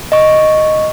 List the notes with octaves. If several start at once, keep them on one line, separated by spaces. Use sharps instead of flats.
D#5 C#6